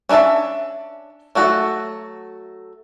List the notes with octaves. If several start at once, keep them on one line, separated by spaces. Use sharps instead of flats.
C#4 D4 C#5 E5 A5
F#3 A3 F#4 A4